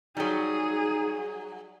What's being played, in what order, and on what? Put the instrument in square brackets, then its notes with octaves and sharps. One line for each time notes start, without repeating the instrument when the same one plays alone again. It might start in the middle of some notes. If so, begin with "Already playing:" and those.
[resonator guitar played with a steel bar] F#3 G3 [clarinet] D#4 [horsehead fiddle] G#4